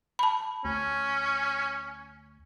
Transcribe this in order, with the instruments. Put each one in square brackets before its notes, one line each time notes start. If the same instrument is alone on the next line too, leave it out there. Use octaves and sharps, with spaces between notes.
[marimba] A5 B5
[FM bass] D2 [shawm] C#4